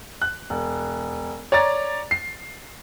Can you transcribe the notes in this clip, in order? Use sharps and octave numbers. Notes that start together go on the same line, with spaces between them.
F#6
E1
C#5 D5 A#5 A6
C7